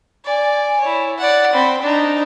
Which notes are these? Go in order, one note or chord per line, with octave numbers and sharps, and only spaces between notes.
D5 G#5
E4 C#5
D5 F#5
C4 B5
D4 D#4